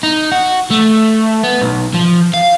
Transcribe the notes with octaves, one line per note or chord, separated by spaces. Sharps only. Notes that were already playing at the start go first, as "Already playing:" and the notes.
D#4
F#4
A3
B3
B1
F3
F5